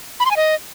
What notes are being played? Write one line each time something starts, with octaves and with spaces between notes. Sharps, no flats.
B5
C6
G#5
D#5